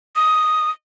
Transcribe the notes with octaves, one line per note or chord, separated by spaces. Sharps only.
D#6